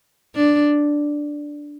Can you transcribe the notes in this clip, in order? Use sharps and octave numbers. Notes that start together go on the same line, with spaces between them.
D4